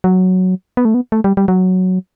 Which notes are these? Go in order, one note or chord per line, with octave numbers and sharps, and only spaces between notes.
F#3
B3
A3
B3
A3
G3
G3
F#3